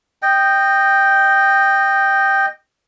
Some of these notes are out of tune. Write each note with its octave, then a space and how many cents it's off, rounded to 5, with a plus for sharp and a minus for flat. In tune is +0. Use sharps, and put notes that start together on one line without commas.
D#5 -15 G5 +0